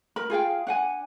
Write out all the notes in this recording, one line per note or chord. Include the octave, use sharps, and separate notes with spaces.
A#4 B5
F4 G#4 F5 G5
D4 F#5 G#5